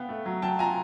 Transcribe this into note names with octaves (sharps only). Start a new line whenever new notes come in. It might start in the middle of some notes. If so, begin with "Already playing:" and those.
Already playing: B3 F5 G5
A3
F#3
F#3 G5 A5
F4 G#5 A#5